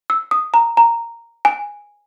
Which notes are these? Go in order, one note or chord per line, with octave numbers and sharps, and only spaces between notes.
E6
D#6
A#5
A#5
G#5